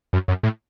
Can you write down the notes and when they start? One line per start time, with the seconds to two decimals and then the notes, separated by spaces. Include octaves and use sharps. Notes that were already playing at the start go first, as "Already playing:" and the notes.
0.13 F#2
0.28 F#2
0.43 A2